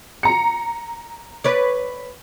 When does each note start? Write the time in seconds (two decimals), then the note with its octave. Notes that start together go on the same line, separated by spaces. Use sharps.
0.23 A#5 C#7
1.44 B4 C#5 D5